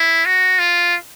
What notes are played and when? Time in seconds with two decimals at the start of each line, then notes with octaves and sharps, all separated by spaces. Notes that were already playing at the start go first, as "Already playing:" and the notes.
Already playing: E4
0.26 F#4
0.59 F4